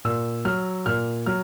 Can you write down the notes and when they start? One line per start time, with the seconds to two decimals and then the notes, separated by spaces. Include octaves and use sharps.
0.05 A#2 E6
0.45 F#3 F6
0.86 A#2 F6
1.26 F#3 F6